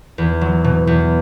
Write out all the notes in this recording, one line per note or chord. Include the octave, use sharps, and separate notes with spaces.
E2
F#3
B2
E2